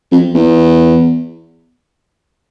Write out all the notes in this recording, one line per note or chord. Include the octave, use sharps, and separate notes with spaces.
F2
E2